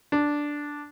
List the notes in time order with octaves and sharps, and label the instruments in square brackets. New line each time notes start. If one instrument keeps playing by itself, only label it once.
[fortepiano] D4